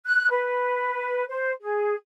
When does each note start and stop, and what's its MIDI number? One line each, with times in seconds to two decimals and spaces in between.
0.05 0.28 90
0.30 1.24 71
1.29 1.51 72
1.61 1.94 68